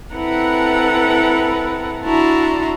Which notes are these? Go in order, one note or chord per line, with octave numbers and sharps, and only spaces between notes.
C4 E4 A4 B4 F#5 A#5
D4 E4 F#4 A5 A#5 C6